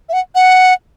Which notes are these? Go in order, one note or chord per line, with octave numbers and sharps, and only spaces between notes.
E5
F#5
F#5